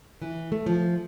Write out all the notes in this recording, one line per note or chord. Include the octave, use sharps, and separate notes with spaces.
E3
A3
F3